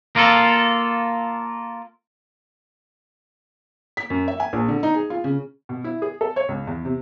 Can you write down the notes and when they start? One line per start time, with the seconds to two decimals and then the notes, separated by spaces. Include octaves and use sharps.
0.16 A#3 F4 A4
3.97 B6
4.10 F#2
4.28 E5
4.40 G#5
4.53 A#1
4.68 D3
4.83 D#4
4.94 G#4
5.10 F4
5.24 C#3
5.69 B2
5.84 E4
6.02 G#4
6.21 A4
6.36 C#5
6.49 C#2
6.67 E2
6.85 C3